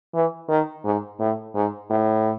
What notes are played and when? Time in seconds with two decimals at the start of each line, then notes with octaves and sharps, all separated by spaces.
0.14 E3
0.49 D#3
0.84 G#2
1.20 A2
1.55 G#2
1.90 A2